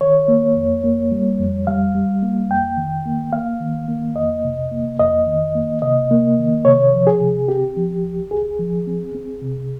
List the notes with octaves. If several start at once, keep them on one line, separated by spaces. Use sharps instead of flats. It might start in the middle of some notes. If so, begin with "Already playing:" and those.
D#3 C#5
A#3
F2
A#3
G3
F2
G3 F5
G3
A#3
F2 G5
D#3
A#3
A#3 F5
D#3
A#3
F2 D#5
C3
A#3
F2 D#5
D#3
A#3
C3 D#5
A#3
D#3
C3 C#5
F3
G#4
C3
C4 G4
F3
C2
C2 G#4
F3
C4
C4
C3